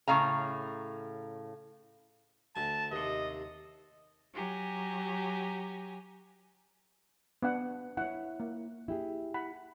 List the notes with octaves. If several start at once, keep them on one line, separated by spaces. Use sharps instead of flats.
A2 C#3 F5 A#5
D2 G#5 A5
D#2 C3 D#5
F#3 G4 G#5 A#5
B3 D4 F#5
E4 C#5 F#5
A#3
E4 G4 G#4
F#5 B5